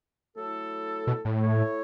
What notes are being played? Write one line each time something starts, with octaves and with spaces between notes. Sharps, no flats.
F#3 A3 E4 A4
B2
A2
A3 E4 A4 C#5